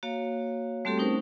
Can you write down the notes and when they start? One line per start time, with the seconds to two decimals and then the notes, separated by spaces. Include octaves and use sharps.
0.03 A#3 F#4 C#5 F5
0.85 G3 A3 C4 F#4 G4 A4
0.98 A3 C4 C#4 D#4 A#4 C5